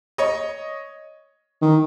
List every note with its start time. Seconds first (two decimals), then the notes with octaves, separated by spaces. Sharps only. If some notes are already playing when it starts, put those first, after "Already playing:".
0.18 C#5 D#5
1.61 D#3